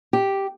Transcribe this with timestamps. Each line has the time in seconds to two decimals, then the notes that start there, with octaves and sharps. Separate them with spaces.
0.13 G4